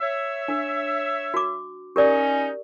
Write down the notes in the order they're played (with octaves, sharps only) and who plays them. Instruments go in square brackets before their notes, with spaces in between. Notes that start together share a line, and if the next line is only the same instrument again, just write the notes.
[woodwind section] C#5 E5
[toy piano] D4
F#4 D6
[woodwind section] C#4 D#4 [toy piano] G4 A#4 D5